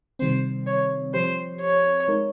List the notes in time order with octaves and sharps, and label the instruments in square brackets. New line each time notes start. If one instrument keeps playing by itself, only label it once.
[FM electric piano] C3 D#3 G3 C4 [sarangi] C5
[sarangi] C#5
[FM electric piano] F3 C4 G4 [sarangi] C5
[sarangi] C#5
[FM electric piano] G#3 D#4 A#4